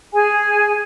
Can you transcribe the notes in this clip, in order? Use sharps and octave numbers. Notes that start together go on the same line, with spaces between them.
G#4 G#5